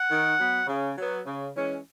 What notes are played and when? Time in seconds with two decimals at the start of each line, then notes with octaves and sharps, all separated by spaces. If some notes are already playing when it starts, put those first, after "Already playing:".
Already playing: F#5
0.10 D#3
0.39 F#3 B3
0.67 C#3
0.96 F#3 B3
1.26 C#3
1.55 E3 G#3 C#4